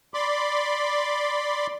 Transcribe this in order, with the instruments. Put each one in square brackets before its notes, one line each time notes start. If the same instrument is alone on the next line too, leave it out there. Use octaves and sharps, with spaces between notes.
[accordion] D5 B5 C6 D6